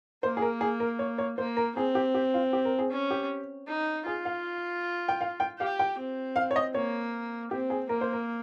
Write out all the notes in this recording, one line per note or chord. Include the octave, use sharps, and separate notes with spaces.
A#3 C5
G#4
A#4
G#4
A#4
C#5
C#5
A#3 C5
A#4
C4 G#4
G4
G4
F4
G4
A#4
G#4
C#4
G4
D#4
F4 G#4
F5
G5
F5
G5
G4 F5
G5
C4
F5
C#5
D#5
A#3 C#5
C4 G4
G#4
A#3 A#4
C5
A#4